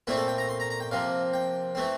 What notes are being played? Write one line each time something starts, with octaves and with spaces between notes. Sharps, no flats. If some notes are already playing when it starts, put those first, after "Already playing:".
A#2 A3 C4 E4
A4
G5
A#5
C6
A#5
A#5
G5
C3 F3 A#3 F5
G5
E3 A3 C4